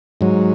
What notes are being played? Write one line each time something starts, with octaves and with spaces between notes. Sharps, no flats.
G#2 F#3